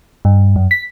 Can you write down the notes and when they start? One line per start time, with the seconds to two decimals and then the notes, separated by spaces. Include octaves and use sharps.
0.25 G2
0.56 F#2
0.71 B6